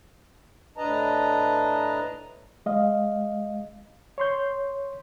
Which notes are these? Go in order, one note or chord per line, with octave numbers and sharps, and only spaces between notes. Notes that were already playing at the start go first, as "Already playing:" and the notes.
A2 D4 B4 D#5 A5 A#5
G#3 D#5 F5
C#5 C6 G6